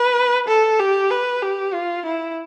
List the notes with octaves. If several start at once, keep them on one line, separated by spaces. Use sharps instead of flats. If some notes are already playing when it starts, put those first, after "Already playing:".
Already playing: B4
A4
G4
B4
G4
F4
E4